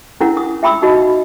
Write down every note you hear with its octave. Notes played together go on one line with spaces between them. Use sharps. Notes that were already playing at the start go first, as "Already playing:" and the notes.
C#4 D4 E4 A#4 F#5
D#6
E5 G5 B5 D#6 E6
D#4 F#4 D#5